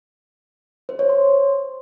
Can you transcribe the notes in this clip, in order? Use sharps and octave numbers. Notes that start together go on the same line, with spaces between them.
C5
C#5
C6